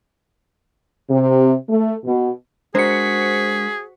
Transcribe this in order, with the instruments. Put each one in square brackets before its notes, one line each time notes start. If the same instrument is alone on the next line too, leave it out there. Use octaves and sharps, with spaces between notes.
[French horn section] C3
A3
B2
[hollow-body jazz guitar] G#3 D4 A#4 [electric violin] F#4 B6 [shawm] G#4 [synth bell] C5 C#7